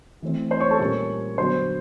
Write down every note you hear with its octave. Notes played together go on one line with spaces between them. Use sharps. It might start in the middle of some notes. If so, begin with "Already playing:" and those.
E3 A3 C4
C5 C6
C#5 C#6
A4 A5
A#2 G3 A#3 C#4 C#5 C#6
D3 F#3 B3 C5 C6